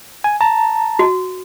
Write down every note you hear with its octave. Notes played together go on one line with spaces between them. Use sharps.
G#5
A5 A#5
F#4